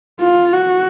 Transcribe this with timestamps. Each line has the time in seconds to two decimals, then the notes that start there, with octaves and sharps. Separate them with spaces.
0.20 F4
0.54 F#4